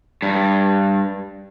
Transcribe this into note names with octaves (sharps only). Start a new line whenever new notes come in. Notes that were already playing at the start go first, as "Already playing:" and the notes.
G2